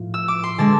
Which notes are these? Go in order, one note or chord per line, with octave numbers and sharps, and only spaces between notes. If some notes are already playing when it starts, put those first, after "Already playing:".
Already playing: A2 F3
E6
D6
C6
D3 G#3 D4 A5